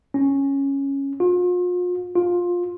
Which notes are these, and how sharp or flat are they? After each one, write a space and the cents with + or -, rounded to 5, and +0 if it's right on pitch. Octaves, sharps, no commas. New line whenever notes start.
C#4 -5
F4 +40
F4 +15